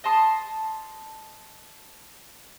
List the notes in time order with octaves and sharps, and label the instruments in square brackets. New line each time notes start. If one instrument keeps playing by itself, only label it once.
[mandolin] D#5 A5 C6 D#6